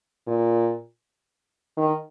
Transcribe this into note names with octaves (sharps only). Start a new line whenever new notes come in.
A#2
D#3